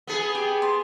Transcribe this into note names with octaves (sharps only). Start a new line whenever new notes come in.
B3 G#4
G4
A5 C6